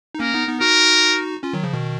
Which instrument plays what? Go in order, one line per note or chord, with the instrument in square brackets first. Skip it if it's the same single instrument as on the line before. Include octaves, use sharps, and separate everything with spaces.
[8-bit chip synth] D#4
[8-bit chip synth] A#3 C#4 [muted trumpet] A#4
[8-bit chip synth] B3 D#4
B3 D#4
[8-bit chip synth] D#4 F#4 [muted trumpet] A#4
[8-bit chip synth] C#4 F4
D#3 F#3
C#3 F3
B2 D#3